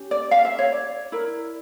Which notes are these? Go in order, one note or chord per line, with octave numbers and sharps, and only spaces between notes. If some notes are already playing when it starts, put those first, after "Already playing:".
Already playing: C#4 G4
D5
F5
E5
C#5
D5
E4 A#4